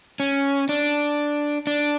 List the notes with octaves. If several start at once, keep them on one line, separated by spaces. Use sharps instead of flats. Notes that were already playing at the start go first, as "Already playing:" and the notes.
C#4
D4
D4